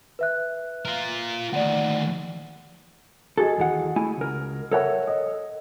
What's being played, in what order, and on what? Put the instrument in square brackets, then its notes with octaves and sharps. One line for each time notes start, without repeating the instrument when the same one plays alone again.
[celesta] B4 E5 F#6
[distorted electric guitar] F4 A#4
[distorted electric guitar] D2 D#3 [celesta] D5 F#5
[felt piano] F#4 G#4 D#5 [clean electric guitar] A4
[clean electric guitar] D#2 E3 F#5
A3 E4 G#5
C#2 A#4
[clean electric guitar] A4 C#5 [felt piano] A#4 E5 F#5
[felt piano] D#5